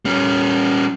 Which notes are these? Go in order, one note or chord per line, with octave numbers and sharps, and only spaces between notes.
G3 C#4